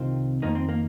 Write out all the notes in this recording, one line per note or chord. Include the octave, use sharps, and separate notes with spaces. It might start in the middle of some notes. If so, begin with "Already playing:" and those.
Already playing: C2 C3 D#3 C4 F4
F2 D#3 A#3 D#4
C4
A#3